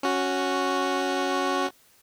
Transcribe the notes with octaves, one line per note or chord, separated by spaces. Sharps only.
C#4 F#4